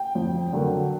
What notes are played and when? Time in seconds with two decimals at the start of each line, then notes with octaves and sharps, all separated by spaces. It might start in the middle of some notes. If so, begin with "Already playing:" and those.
Already playing: G5
0.15 F2
0.52 D3 F#3 A#3